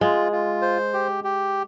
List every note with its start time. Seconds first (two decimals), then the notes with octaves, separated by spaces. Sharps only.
0.01 G#3 F4
0.32 F4
0.62 C5
0.93 G4
1.24 G4